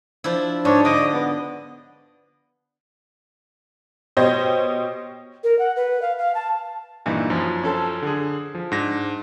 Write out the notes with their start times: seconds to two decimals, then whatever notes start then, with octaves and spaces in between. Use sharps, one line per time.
0.24 F3 D4 E4
0.65 G#2 D4 C#5
0.85 D3 D#5 D6 D#6
1.13 B3
4.17 B2 G4 C5 C#5 D#5
5.43 A#4
5.59 F#5
5.76 B4
6.01 F5
6.18 F5
6.34 A5
7.06 G2 A#2 E3 D#4
7.30 F#2 F3
7.63 C#4 A4 C5
8.02 D3 G#4
8.55 F3
8.72 G#2 D4 A#6